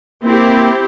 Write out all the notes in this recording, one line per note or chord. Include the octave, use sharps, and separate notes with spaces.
A#3 C4 E4 G4